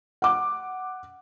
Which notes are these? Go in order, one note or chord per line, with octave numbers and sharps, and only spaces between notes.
F#5 D6